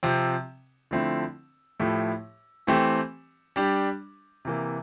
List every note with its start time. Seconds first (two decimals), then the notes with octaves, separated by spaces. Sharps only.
0.03 C3 F3 C4
0.91 D3 F3 A3 C4 E4
1.80 A2 F3 A3 E4 G4
2.67 E3 A3 C4 G4 C5
3.56 G3 D4 G4
4.45 C3 E3 A#3